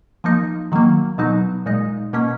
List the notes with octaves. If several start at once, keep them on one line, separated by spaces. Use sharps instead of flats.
F3 A#3 D#4
D#3 F#3 A#3
B2 F#3 B3 D#4
A#2 G#3 D#4
B2 A#3 C#4